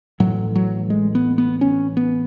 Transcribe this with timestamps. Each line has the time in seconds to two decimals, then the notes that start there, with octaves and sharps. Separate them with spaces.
0.20 A1 A2 F#3
0.55 F#3
0.90 G#3
1.15 B3
1.38 B3
1.61 C#4
1.97 B3